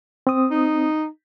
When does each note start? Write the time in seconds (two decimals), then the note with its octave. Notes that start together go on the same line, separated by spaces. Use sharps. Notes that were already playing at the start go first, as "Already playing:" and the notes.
0.27 C4 D#6
0.51 D#4